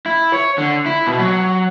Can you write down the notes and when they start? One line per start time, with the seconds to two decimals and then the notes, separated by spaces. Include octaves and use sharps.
0.06 E4
0.33 C#5
0.58 D3
0.86 E4
1.07 B2
1.19 F#3